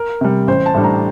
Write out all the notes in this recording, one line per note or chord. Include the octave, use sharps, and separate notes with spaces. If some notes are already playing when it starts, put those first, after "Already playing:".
Already playing: A#4
C3 G3
A1 C5
A5
A2 G3 D4
A#5